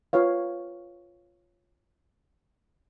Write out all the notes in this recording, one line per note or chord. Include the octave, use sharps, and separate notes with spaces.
F4 B4 C#5 F5